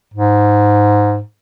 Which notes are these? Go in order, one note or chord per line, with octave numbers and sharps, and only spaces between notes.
G#2